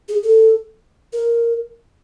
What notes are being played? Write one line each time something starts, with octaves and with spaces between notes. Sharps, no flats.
G#4
A4
A#4